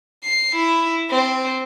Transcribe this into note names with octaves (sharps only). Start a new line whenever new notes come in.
C7
E4
C4